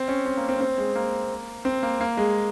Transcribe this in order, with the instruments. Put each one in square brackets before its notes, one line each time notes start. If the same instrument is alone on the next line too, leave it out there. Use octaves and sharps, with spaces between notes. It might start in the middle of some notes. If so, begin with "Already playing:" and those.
Already playing: [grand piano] C4
C#4
C4
A#3
C4
A#3
C4
G#3
A#3
C4
A#3
A#3
G#3